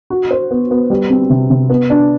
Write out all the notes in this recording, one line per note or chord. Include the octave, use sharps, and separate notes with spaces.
F#4
C5
B3
B3
G3
C4
C3
C3
B3
D4